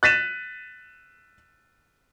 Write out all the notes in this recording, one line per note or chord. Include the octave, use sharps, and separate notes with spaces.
F#6 A6 B6 D#7 E7